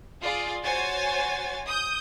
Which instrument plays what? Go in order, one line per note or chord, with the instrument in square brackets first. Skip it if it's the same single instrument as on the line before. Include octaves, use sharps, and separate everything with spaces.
[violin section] F4 G#4 D5
F#4 C5 C#5 G#5 A6
D#6 G6